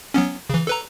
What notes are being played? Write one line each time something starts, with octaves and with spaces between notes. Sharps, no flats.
F#3 B3 C#4
C#3 E3
A4 B4 A#5